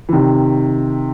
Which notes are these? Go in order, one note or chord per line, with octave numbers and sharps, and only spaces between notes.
E3
C3 D#3